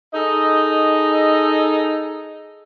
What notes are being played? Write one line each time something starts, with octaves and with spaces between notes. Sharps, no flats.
D#4 G#4 A4 D#5